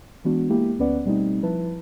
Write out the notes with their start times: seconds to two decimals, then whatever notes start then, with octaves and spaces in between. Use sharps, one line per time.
0.25 E3 G#3 B3 D4 F#4
0.49 G#3 A#3 E4 G4
0.79 D2 B3 C#4 B4 D5 F#5
1.05 B2 G3 A3 C4 D#4
1.42 F3 E4 B4 A5